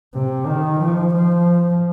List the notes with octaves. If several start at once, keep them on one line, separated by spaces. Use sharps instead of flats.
C3
D#3
F3
F3